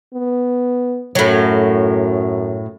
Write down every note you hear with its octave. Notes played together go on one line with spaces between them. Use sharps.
B3
F#2 A2 F#3